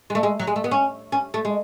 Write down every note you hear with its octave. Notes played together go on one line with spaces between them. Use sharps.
G#3
A3
G#3
F#3
G#3
A3
B3
C#4
C#4
A3
G#3